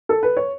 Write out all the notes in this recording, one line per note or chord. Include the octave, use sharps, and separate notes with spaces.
A4
B4
C#5